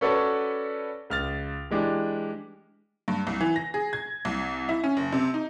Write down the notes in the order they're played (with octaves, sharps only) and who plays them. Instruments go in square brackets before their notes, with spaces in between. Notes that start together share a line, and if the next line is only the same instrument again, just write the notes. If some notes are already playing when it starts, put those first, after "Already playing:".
[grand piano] C#4 F#4 A4 B4 C#5 D5
C#2 F6 A6
E3 G#3 D4 G4
[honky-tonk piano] G2
C2
E3
A#6
G#4
G#6
C2
E4
C#4
F#1
C3
D#4